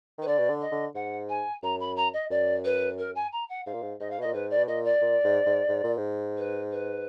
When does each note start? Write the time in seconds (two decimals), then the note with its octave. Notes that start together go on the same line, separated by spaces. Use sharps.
0.18 D#3 B4
0.27 D3 D5
0.38 B2
0.49 D3
0.61 D#5
0.71 D3
0.94 G#2 F#5
1.29 G#5
1.63 F#2 A#5
1.80 B5
1.96 A#5
2.13 D#5
2.30 F#2 D5
2.64 B4
2.98 A#4
3.15 G#5
3.32 A#5
3.49 F#5
3.66 G#2 F5
3.74 A#2
3.82 G#2
4.00 G#2 D#5
4.10 F5
4.18 B2 D#5
4.26 A#2
4.33 G#2 B4
4.50 D5
4.57 B2
4.67 A#2 D#5
4.84 D5
5.01 A#2
5.24 G#2
5.46 G#2
5.68 G#2
5.84 A#2
5.98 G#2
6.37 B4
6.71 B4